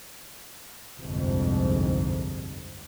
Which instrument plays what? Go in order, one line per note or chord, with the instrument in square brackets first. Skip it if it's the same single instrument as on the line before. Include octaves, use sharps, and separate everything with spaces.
[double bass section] G1 C2 F2 G#2